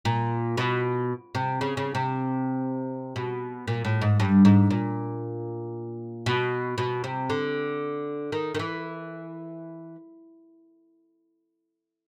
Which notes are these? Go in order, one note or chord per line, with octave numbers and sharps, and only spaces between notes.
A#2
B2
C3
C#3
C#3
C3
B2
A#2
A2
G#2
G2
G#2
A#2
B2
B2
C3
D3
D#3
D#3
E3